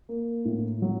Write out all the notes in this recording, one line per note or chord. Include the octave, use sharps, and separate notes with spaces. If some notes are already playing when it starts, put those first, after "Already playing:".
A#3
A2
F#3